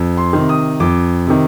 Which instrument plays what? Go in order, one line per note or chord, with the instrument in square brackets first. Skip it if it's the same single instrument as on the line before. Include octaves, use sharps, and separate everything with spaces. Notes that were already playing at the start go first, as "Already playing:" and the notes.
Already playing: [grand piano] F2
C6
C3 D#3
D#6
F2 D6
C3 D#3